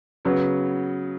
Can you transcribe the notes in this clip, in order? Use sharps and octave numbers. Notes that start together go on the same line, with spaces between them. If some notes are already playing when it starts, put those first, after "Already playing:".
C#3 F#3 B3